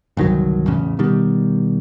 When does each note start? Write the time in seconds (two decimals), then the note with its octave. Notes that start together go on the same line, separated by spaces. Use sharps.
0.17 G1 C2 D#3 F#3
0.67 A1 E2 C#3
0.99 B2 D#3 G3